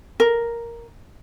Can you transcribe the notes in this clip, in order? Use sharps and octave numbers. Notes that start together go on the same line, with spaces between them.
A#4